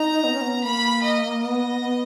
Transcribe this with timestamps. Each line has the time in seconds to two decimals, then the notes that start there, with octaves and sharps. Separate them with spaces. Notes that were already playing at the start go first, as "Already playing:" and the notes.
Already playing: D#4 A#5
0.24 B3
0.33 C#4
0.41 B3
0.64 A#3 B5
1.03 D#5
1.42 B3 D#5
1.81 B3